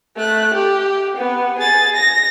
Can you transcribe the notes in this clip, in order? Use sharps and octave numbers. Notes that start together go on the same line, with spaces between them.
A3 F#6
G4
B3
G#4 A6
A#6